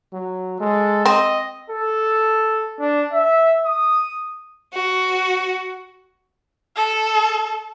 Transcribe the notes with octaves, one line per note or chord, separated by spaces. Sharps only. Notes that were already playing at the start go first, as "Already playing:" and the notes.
F#3
G#3 A4
C4 D#5
A4
D4
E5
D#6
F#4
A4